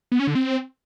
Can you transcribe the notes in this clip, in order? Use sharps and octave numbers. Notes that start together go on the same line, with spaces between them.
B3
C#4
D3
C4